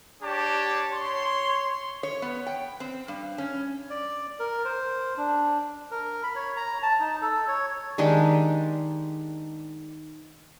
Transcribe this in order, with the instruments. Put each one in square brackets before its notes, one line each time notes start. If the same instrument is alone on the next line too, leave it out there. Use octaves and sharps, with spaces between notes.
[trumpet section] D4 G4 C#5 A5
C#5 C6
[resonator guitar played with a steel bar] C#5
B3
G5
C4
G2
C#4
[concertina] D5
A#4
C5
D4
[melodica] A#4
B5
C#5
A#5
A5
D#4
A4
C#5
[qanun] D#3 G#3 D4 G4